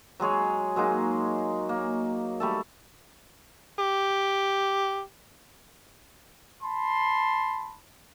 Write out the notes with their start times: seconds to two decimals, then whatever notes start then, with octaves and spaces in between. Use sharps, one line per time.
0.20 F#3 G#3 G#4 C#5
0.76 F#3 G#3 A#3 D#4
1.69 A#3
2.40 G3 A3 A4
3.79 G4
6.63 A5 B5 C6